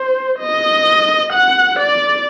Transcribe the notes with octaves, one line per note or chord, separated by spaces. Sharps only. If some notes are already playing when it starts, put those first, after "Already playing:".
Already playing: C5
D#5
F#5
D5